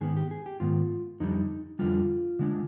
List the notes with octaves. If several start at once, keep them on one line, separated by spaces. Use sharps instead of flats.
G#2 D#3 B3 G#4
G4
G#4
G4
G#2 D#3 B3 F4
F2 D3 G3 D#4
F2 D3 G3 F4
D3 G#3 D4